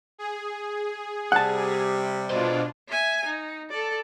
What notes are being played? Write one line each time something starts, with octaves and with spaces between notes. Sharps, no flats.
G#4
C3 G3 F#5 A5
B2 D4 F4 C5 D#5
E5 G#5
D#4
A4 D5